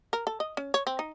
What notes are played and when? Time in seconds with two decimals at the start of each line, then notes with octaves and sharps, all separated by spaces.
0.13 A#4
0.27 A4
0.40 D#5
0.57 C#4
0.74 C#5
0.87 C4
0.99 D#4